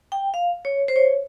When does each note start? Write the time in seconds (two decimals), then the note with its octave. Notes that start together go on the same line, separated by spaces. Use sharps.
0.12 G5
0.34 F5
0.65 C#5
0.88 C5
0.96 C#5